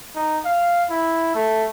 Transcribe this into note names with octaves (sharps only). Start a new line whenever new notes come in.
D#4
F5
E4
A3